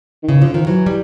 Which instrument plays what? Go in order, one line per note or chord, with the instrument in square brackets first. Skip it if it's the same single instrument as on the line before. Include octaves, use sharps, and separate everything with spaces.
[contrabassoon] D#3
[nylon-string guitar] C#3 [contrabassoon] E3
[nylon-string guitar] D3 [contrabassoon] F3
[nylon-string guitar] D#3 [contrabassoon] F3
[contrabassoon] E3 [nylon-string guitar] F#3
[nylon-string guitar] G3